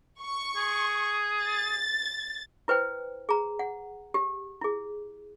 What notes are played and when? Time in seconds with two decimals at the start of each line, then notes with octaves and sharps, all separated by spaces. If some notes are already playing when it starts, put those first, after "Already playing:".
0.22 C#6
0.56 G#4
1.42 A6
2.68 E4 B4 C5 G5
3.29 G#4 A#5
3.59 F#5
4.14 G4
4.61 E4 G#4